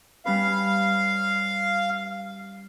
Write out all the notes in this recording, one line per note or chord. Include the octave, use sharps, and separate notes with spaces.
G3 C#4 B4 F5